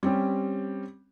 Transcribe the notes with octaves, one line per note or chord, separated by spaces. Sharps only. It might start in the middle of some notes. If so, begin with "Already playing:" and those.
G3 C4 C#4 G4